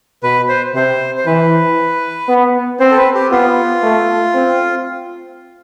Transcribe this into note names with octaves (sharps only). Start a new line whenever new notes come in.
B2 B4
C5
C3 C5
C5
E3 B4
B3
C4 C5
A4
B4
G4
B3 F4
A3
C4